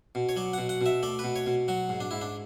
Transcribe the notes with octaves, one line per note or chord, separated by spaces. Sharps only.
B2
C#5
F#3 D5
B2 F#5
F#5
B2 E5
A3 D5
B2 B4
C#5
B2
F#3 F#4
G#2
D4
G#2 E4
D4